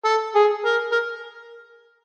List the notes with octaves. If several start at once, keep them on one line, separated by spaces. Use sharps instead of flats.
A4
G#4
A#4
A#4